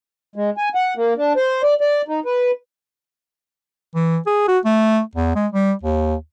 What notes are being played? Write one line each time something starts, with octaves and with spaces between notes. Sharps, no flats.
G#3
G#5
F#5
A#3
D4
C5
D5
D5
D#4
B4
E3
G#4
F#4
A3
E2
G#3
G3
D#2